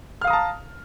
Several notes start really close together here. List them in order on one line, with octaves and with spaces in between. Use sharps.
F6 F5 D#6 A#5 A5